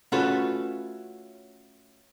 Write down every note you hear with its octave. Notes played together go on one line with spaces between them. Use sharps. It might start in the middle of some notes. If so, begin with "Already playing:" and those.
A3 C#4 F4 F#4 A4 B4